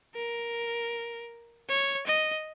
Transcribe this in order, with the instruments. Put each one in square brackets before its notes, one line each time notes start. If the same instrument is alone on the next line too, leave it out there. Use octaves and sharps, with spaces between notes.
[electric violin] A#4
C#5
D#5